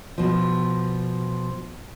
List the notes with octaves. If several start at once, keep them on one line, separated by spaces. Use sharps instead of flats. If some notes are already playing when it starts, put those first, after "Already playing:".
B2 F3